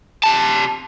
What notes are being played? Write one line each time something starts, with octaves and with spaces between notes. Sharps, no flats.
C3 A5